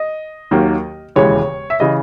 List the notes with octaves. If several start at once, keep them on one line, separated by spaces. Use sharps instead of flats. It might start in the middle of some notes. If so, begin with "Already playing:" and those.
Already playing: D#5
D#2 D#3 F#3 A#3
E1 D#2 C#3 E3 G#3 C#5
E5
C#3 E3 D#5